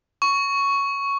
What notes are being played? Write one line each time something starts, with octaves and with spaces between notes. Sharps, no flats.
C#6